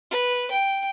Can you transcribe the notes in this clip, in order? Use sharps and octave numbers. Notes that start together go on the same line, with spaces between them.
B4
G5